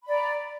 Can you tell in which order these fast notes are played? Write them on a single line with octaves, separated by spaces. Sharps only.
B5 D5 A#5